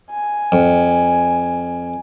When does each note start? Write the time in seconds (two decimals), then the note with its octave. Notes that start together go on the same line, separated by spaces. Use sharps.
0.10 G#5
0.52 F2